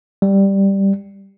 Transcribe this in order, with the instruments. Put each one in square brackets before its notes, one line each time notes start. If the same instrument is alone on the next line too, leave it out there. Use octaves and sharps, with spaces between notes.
[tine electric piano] G3